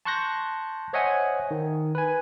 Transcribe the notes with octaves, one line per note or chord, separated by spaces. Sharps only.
A5 C6 C#6 F#6 G6 A#6
C5 C#5 D#5 E5 F#5 G#5
D#3
B4 G#5